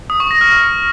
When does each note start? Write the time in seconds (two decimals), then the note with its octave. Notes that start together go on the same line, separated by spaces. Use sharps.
0.10 D#6
0.20 C#6
0.31 A#6
0.41 F6
0.52 F6